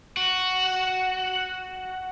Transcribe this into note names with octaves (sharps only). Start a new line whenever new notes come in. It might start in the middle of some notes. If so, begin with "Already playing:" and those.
F#4